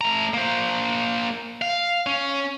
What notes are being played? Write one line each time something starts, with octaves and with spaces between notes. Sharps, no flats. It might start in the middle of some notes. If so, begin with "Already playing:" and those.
A3 A#5
A#3 C5
F5
C#4